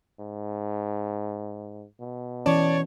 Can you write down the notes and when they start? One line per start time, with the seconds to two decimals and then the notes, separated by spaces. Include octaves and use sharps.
0.20 G#2
2.01 B2
2.46 E3 C#4 C#5 D5 A5